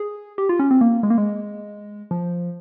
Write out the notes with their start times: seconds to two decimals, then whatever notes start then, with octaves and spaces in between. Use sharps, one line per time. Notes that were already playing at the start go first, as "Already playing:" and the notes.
Already playing: G#4
0.38 G4
0.49 F4
0.59 C#4
0.71 C4
0.81 A#3
1.03 G#3
1.10 A#3
1.18 G#3
2.11 F3